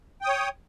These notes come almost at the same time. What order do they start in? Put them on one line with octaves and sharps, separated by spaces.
G5 D#6 C#5